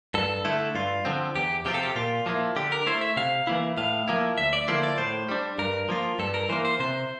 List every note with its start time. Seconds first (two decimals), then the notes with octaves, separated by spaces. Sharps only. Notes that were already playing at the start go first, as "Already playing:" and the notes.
0.14 G2 A4
0.45 D3 A3 E4
0.75 G2 F4
1.05 D3 F3 C4
1.35 E2 G4
1.65 C3 F3 C4 F4 G4
1.74 A4
1.83 G4
1.96 A#2 F4
2.26 F3 A#3 E4
2.56 D3 G4
2.72 A#4
2.86 A3 E4 C5
3.01 E5
3.17 C3 F5
3.47 E3 A#3 E4
3.77 A2 F5
4.08 F3 A#3 E4
4.38 D2 E5
4.53 D5
4.68 D3 F3 A#3 E4 C5
4.83 D5
4.98 A2 C5
5.29 G3 D4
5.58 G2 A#4
5.89 F3 A#3 F4
6.19 G2 A4
6.34 A#4
6.49 E3 A#3 C5
6.65 C5
6.80 C3 C5